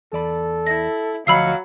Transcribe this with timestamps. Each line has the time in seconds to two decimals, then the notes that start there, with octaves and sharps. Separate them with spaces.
0.13 E2 A4 D5 B5
0.67 E4 A#6
1.27 D2 F3 F#3 D#5 F5 B5 E6 C7